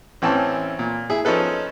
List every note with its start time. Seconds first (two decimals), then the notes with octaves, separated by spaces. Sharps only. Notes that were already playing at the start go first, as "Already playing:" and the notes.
0.22 A1 E3 C4 C#4 A5
0.79 A#2
1.10 E4 G#4
1.25 F3 C#4 D#4 A4 B4